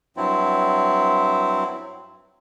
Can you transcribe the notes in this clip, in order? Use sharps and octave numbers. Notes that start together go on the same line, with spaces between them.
G2 F#3 C4 E4